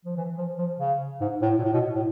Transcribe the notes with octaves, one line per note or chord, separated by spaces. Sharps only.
F3
E3
F3
F3
C#3
G#2
A2
A#2
A2
B2
A2